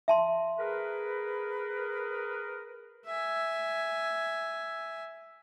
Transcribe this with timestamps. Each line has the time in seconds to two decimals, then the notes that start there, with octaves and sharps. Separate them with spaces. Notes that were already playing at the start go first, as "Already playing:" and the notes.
0.08 E5 A5 C6
0.59 G#4 A#4 B4
3.06 E5 G#5